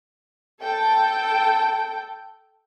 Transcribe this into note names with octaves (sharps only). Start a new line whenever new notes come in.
A4 G5